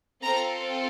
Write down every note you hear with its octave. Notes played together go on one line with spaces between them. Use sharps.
C4 F4 A4 A#5